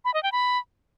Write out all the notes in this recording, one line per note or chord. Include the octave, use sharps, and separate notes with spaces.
B5
D#5
G5
B5